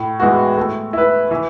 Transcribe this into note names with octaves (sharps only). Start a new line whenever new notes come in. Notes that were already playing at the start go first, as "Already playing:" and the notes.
Already playing: A2
E3 G#3 B3 F#4
A3
E4 B4
E3